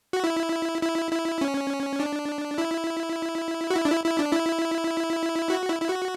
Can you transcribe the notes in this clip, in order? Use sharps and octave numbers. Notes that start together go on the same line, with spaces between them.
F#4
E4
E4
E4
C#4
D4
E4
F#4
E4
D4
E4
E4
D4
E4
F#4
E4
E4
F#4